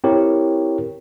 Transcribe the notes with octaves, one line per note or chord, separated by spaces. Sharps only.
C4 E4 G4 A#4 C#5